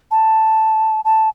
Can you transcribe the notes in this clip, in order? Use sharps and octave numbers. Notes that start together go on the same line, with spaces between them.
A5
A5